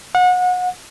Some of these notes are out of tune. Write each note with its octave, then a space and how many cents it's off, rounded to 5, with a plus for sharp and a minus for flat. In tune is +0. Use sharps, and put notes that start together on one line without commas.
F#5 -30